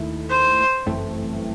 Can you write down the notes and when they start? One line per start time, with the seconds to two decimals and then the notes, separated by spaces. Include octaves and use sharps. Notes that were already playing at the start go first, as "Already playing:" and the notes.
Already playing: D#2 D#3 A3 E4
0.30 C5
0.86 G1 F#2 E3 A3 C4